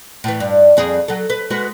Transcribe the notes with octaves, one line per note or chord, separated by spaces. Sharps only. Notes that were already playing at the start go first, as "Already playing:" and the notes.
A2 E3
G2
F2 G#4
F#3 A4
B4
G#3 F#4 B4